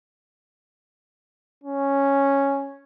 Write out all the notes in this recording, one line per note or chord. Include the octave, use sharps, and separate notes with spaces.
C#4